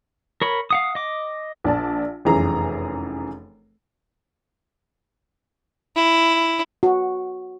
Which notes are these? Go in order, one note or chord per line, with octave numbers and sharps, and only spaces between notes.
A#4 C#5 B5
F5 F#5 D#6
D#5 D6
A#1 D5 A5
F1 F#2 E3 G#4 A#5
E4
F#4